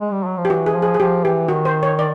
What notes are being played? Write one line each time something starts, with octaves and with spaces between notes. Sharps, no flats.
G#3
G3
F#3
F3
G4
E3 F#4
G#4
F3
G#4
G#4
F3 G4
E3 G4
D#3 F#4
C5
C#5
D5